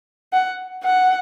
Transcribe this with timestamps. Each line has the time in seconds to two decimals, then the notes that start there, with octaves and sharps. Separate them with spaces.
0.33 F#5
0.84 F#5